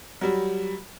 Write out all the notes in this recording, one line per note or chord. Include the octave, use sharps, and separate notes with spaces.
F#3 G3